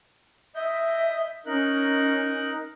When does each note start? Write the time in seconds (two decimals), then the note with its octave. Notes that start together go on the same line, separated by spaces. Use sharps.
0.55 D#5 E5 G6
1.46 C#4 D#4 A#4 F#6